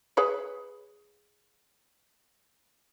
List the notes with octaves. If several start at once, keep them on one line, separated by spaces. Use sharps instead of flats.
G#4 B4 C#5